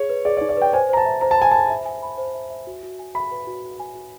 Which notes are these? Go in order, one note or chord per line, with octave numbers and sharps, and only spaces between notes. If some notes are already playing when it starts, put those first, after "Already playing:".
Already playing: G#4 C#5
B4
G#4 D5
D5
D#4
D5
B4 G5
C5 G#5
C5 A#5
A5
E5
C5 A#5
A5
G#5 B5
A5 B5
E5
G#5
B5
C5
E5
E5
F#4
F#4
G#5
E5 B5
B4
F#4
F#4
G#5
F#4